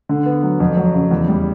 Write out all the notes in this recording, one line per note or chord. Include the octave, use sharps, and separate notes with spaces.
D3
B3
F#3
F2
F#3
C#3
E2
G3